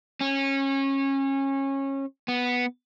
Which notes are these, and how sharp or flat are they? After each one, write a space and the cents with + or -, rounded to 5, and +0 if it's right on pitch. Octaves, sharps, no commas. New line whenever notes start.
C#4 -25
B3 -5